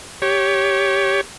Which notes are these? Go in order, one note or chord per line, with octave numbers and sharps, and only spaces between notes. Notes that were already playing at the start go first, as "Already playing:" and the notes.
G4 C#5